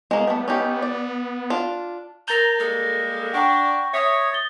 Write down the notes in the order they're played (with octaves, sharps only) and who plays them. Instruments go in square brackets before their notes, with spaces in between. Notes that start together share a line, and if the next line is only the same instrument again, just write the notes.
[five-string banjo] G#3 A#3 [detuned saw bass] B3
[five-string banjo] G3 A3
C#4 D#4 G4
D5
D4 F4
[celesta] A#4 A6 G7 [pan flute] A#5 [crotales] G6 A#6
[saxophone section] G3 G#3 A#3 [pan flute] A4
[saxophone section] D4 [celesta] F#5 G5 A#5 [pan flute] C#6
[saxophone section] C#5 [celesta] E5 B6 [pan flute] D#6
[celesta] A6 G7